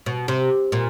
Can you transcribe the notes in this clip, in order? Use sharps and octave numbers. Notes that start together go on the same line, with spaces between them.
B2
C3
A#2